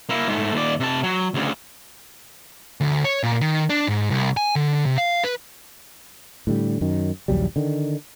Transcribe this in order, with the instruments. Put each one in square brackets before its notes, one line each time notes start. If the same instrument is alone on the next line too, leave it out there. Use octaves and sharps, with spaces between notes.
[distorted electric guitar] A#3 E4
G#2 A3
D#2 D5
C3 A5
F#3
D2 C#3
[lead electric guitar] D2
C#5
A#2
D#3
D4
G#2
C2
G#5
D3
C3
F5
B4
[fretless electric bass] A2 D3 G3
F#2 D#3
A#1 D#2 F#3 G3
D3 D#3